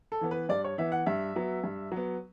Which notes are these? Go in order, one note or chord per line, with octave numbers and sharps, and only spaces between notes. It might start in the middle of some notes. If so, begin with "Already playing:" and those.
A4
E3 B3
B4
G2 D5
C#5
E3 B3 E5
F#5
G2 E5
F#3 B3
G2
F#3 B3